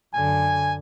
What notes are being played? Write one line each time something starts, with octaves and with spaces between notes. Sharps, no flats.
F#2 D3 G#5